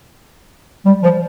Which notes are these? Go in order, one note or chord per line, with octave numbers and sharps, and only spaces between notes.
G3
F3